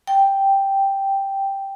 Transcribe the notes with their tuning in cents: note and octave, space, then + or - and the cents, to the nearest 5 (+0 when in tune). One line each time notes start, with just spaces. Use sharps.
G5 +0